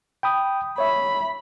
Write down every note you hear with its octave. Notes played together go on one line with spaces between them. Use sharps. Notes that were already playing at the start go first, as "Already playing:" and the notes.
G5 B5 D#6
C#5 E5 B5